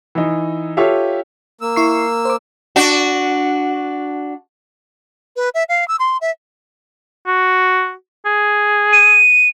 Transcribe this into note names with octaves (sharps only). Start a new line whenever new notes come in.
E3 D#4
F4 G4 A4 C#5 E5 F5
A#3 E6
E4 C#6 C7
C5 D6
D4 F#4
B4
E5
F5
E6
C6
E5
F#4
G#4
D#7